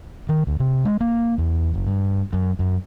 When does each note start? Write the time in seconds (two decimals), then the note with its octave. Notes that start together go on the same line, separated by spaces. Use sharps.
0.29 D#3
0.47 D2
0.60 C3
0.85 G#3
1.01 A#3
1.38 E2
1.74 F#1
1.87 G2
2.33 F#2
2.59 F#2